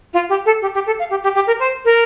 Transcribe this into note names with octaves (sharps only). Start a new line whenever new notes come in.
F4
G4
A4
G4
G4
A4
F5
G4
G4
G4
A#4
C5
A#4